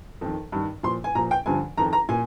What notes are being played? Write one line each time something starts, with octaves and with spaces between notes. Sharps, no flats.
F2 D#3
G2 D#3
A#2 F3 C6
G#5
A#2 F3 A#5
G5
G2 D3 F3 G#5
F2 D#3 A#5
A#5
A#2 G#5